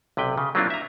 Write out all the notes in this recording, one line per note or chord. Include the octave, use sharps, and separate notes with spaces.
B1 C3 B4 G5
C#3
F#3 A#3 C4 D4 E4 F4
E5 A#5